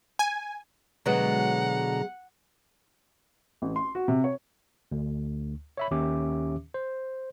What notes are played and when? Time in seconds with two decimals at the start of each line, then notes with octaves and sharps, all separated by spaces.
0.19 G#5
1.06 B2 D3 F#3 G#3 B3 F#5 A#5
3.62 A1
3.76 C6
3.95 F#4
4.08 C3
4.24 C#5
4.92 D2
5.77 C#5 E5 B5
5.91 D#2 D#3 C#4 G4 E5 D6
6.74 C5